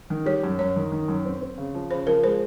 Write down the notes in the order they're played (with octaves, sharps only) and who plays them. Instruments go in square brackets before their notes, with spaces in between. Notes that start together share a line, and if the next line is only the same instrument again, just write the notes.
[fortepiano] D#3
[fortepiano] G3 [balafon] C#5
[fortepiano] F#2
[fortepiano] F#2 [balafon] C#5
[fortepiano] D#3
D#3
F#2
C4
C4
C#3
F3
[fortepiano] C#3 [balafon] C5
[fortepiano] F3 [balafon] A#4
[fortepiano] G#3 [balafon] C5